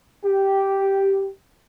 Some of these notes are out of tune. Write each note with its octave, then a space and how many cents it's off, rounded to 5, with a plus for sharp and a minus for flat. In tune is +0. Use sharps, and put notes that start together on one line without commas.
G4 -5